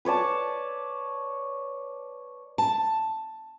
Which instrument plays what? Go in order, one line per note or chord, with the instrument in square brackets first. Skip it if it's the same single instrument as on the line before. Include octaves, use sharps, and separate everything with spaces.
[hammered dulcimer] B4 C#5 D5 A5
[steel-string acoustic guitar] A5